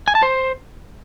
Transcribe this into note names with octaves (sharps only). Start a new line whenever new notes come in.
G#5
A5
C5